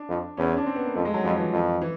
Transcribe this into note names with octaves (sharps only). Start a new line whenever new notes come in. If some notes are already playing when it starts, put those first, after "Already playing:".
Already playing: D4
F2
E2 C#4
C#4
D4
C4
B3
A#3
F2 A3
G#3
F#3
F2 F3
E3
F2
E3